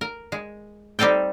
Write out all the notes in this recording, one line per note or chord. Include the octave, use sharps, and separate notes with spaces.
A#4
G#3
G3 C4 D#4 A4 G5